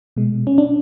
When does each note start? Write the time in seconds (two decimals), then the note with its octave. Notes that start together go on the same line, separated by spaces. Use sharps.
0.16 B2 G#3
0.47 C#4
0.58 D4